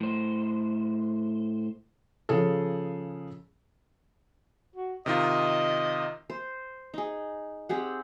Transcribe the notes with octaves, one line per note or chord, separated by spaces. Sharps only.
A2 C5
C#3 F3 G#4 A4
F#4
C3 D#3 F4 D#5
C5
D#4 G#4
C4 G4 G#4 F#5